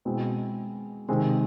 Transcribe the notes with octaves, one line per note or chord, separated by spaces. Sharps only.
B2 G#3 C4 E4
C3 D#3 G#3 C4